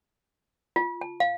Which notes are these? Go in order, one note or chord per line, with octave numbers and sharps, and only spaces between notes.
F4
A5
F5